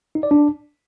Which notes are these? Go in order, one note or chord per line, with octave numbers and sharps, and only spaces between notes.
D#4
D5
D4